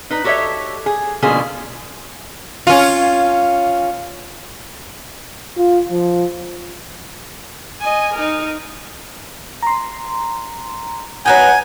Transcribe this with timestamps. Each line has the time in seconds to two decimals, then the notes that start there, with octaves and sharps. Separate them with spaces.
0.10 D#4 B4
0.24 F#4 G4 A4 C#5 D#5 E5
0.86 G#4
1.22 B2 D3 F3 A#3 C#4 G#4
2.67 C#4 F4
5.57 F4
5.91 F3
7.81 D#5 G#5
8.14 D#4 A#4
9.63 A#5 C6
11.26 F#3 B3 D#4 F#5 G#5 A#5 F#6 G6